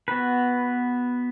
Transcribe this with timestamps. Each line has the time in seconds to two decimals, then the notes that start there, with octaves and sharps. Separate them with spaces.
0.08 B3 F#4 B4